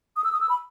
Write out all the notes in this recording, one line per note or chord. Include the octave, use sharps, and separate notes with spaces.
D#6
E6
D#6
E6
B5